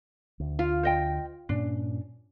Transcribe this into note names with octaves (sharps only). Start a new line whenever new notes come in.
D2
F4
C5 D#5 G5
G2 A#2 C#4 D4